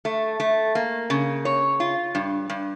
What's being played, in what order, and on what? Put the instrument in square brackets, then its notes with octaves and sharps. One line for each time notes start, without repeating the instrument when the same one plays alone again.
[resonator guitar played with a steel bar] A3
A3
A#3
C#3
C#5
F4
G2
G2